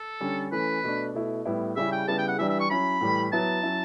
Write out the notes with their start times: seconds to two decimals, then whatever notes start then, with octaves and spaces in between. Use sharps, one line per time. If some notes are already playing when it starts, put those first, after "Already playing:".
Already playing: A4
0.21 D3 G3 C#4
0.52 E3 A3 C#4 B4
0.84 B2 A3 D4
1.14 B2 A3 E4
1.46 A2 G3 B3 E4
1.76 C#3 G3 C#4 E4 E5
1.92 G5
2.08 C#3 G3 B3 E4 A5
2.18 G5
2.28 F#5
2.39 E3 G3 D4 E5
2.49 E5
2.60 C#6
2.70 F#3 C#4 E4 B5
3.01 A2 E3 G3
3.33 F#3 B3 E4 A5
3.63 F#3 C#4 E4